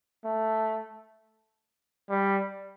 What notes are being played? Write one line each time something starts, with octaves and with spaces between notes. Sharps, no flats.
A3
G3